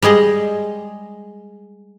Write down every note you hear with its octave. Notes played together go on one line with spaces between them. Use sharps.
G3 G#3 G#4 D#5